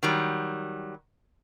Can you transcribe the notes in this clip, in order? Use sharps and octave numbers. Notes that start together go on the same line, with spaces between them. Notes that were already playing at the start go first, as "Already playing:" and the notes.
D#3 F#3 G3